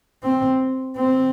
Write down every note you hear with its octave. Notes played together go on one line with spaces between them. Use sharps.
C4
C4